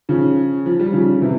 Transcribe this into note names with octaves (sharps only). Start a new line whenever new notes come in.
C#3 F3
F3
G3
C#3 F3
C3 E3